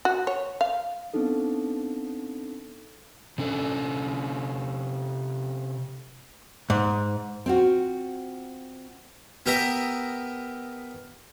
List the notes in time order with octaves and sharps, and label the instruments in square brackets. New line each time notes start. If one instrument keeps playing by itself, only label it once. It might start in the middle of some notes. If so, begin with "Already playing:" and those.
[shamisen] F#4
C#5
F5
[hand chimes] B3 C4 D4 D#4 A4
[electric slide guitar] C3 C#4 A4
[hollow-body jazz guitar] G#2
[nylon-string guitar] C4 F4 F#4
[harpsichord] B3 G4 A#4 D#5 E5 A#5